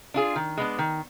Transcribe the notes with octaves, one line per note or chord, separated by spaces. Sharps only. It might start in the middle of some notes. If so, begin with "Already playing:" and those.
D4 F4 G#4
D#3
G#3 B3 D4
D#3